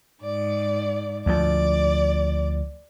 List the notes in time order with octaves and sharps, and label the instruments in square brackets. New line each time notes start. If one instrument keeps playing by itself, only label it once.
[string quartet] G#2 D5
[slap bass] D2 F3 [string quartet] D5